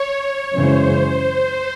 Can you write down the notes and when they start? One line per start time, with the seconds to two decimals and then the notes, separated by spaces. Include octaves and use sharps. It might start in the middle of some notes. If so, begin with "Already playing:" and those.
Already playing: C#5
0.53 F#2 C#3 E3 G#3 C#4 C5